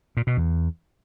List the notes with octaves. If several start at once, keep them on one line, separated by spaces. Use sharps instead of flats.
A#2
B2
E2